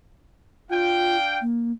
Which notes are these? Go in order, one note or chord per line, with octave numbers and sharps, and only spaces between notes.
D4 F4 F5 G5
A#3